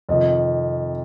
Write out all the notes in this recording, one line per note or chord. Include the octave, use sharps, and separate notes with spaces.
F2 C3 D#3 D#5